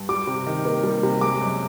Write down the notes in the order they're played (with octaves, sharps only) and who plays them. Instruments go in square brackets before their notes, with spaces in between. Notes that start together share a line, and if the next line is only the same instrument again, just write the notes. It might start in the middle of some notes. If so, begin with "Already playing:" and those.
Already playing: [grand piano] G2
G3 D6
C3
D#3
A#3
G3
C3
G#3 D6
F#2